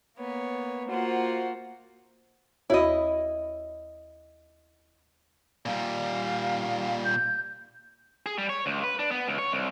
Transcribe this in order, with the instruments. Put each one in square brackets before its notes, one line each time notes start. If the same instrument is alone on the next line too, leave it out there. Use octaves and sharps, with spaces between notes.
[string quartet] A#3 B3 C#5
[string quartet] A#3 F4 F#5 [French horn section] F#4 C5
[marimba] D#2 F#4 C#5 [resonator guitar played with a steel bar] E4 D#5
[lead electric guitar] A#2 G3 [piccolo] F5
[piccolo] G6
[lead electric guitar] G#4
G3
C#5
C#2
B4
D4
B3
C#2
C#5
C2